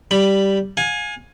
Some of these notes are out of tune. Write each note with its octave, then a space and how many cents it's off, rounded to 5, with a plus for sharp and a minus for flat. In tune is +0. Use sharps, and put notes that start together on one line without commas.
G3 -5 B5 +0
F5 +40 G#5 +0